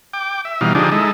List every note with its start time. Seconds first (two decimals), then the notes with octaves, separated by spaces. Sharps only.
0.14 G5 D6
0.45 E5
0.61 B2 E3 G3 D#4 F5
0.75 D3 F3 D4 D#4 G4 G#4
0.92 G#3 D#4 E4 A4